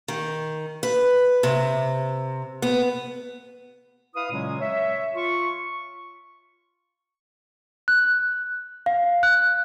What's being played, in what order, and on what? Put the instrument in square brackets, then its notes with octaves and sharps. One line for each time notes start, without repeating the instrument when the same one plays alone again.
[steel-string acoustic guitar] D#3
B4
C3
B3
[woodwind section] E4 B4 F5 D#6
A#2 C#3 F#3 G#3 C#4
C#5 E5
F4 C#6
[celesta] F#6
F5
F#6